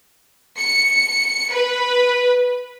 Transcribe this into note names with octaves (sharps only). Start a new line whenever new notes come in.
C#7
B4